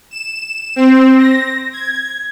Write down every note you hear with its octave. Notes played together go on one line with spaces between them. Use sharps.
E7
C4
A#6
G#6